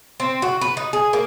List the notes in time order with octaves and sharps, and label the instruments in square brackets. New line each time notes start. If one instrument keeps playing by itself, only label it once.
[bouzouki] C4
F#4
B4
D#4
G#4
A#3